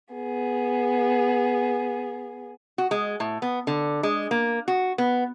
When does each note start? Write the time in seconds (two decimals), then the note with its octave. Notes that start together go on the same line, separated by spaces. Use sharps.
0.14 B3 G#4
2.78 F#4
2.91 G#3
3.20 A2
3.42 B3
3.67 D3
4.03 G#3
4.31 A#3
4.68 F#4
4.98 B3